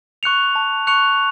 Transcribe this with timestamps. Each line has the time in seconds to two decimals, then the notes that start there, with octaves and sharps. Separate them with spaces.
0.23 C#6 F#6 C#7 F7
0.55 A5
0.87 C#6 F#6 C#7 F7